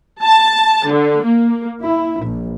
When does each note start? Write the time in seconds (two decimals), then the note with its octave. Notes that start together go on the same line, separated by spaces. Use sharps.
0.21 A5
0.89 D3
1.25 A#3
1.82 E4
2.20 A#1